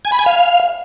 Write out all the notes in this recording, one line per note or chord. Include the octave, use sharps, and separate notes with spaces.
G#5
B5
G#5
F5